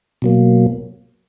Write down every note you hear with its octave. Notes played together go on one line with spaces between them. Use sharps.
B2 F#3 A#3